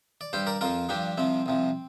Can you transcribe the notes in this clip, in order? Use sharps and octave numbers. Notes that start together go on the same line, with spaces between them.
D5
G2 G3 G4 C5
A#4 D5
F2 F3 F4 A#4
G2 F3 D4 G4
C2 C3 F3 C4
C2 C3 F3